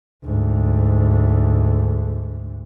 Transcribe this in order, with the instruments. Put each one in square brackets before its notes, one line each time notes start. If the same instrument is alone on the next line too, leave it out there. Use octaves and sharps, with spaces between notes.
[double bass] D2 G#2